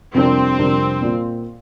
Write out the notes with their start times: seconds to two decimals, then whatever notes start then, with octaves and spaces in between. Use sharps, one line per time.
0.14 F2 C3 G3 C4 D4 A#4
0.58 F2 C3 G3 D4 A#4
1.02 A#2 A#3 F4